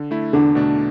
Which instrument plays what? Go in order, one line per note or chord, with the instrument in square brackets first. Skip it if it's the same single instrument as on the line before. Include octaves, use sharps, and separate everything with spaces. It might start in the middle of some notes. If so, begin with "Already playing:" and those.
Already playing: [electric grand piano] D3
A3 E4
[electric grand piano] E2 [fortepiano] D3
[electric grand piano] B2 A3 D4